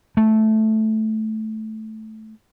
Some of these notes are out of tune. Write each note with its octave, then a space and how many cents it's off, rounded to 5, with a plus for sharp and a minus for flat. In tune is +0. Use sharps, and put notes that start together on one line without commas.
A3 -10